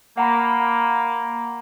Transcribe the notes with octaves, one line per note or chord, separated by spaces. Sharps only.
A#3 F#5 A#5 B5